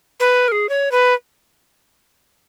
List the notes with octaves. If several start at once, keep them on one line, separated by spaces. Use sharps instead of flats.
B4
A#4
G#4
C#5
B4